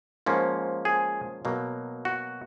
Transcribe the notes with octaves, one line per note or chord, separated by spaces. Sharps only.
G#2 F3 A#3 C#4
G#4
B2 F#3 A#3
F#4